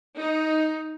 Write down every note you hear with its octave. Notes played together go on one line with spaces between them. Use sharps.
D#4